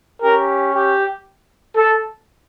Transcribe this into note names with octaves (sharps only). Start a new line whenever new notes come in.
C#4 G4 A#4
G4
A4